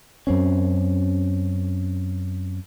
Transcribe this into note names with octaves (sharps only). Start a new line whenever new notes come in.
F#2 C4 C#4